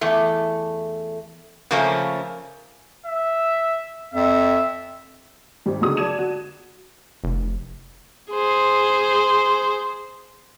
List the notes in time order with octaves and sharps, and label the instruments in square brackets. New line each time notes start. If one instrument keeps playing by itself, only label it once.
[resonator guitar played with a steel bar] E2 A3
C#3 F3 A3 A#3 C#4
[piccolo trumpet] E5
[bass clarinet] F2 [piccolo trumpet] E5
[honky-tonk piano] G#1 G3
C#2 D3 F#3 G#3 D#6
F#3 D5 A5 G#6 D#7 E7
F#4
[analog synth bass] F1
[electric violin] G#4 C5